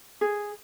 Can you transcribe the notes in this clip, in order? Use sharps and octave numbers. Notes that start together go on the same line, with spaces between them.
G#4